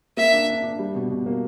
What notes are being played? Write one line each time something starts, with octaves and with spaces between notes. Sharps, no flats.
A#3 E5
D4
D4
D4
G3
B2
B2
A#3